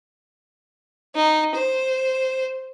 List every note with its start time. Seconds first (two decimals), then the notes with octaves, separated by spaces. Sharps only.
1.16 D#4
1.55 C5